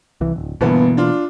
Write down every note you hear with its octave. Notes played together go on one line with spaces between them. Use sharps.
C2 E3
D1
G1 B2 E3 A#3 B3
D4 F4